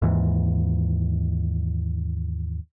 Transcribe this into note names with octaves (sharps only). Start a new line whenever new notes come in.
D#2 G#2 E3